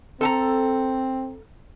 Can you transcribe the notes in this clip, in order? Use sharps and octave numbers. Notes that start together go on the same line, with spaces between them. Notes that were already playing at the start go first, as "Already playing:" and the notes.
C4 A4 A5 A#5